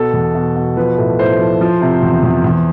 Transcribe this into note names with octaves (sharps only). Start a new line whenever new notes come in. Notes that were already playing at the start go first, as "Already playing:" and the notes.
Already playing: B2 A4
E2
B2
B2
F3 B4
A2
A2 C5
F3
F3
C3
E2
E2
E2